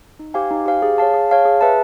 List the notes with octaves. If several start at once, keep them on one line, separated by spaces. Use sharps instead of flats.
D#4
G4 C5 F5 G#5
D#4
G4 C5 F5 G#5
G#4
C#5 F5 A5
G#4
C#5 F5 A5
G#4
B4 E5 A5